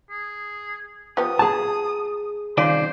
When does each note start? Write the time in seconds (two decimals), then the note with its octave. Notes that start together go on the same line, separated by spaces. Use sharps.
0.10 G#4
1.17 F3 B3 G4 D#6
1.39 G#4 A5
2.57 C2 D#3 C#4 F4 C5 D5